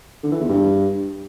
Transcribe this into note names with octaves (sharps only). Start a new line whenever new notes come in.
D3
E3
E2
G2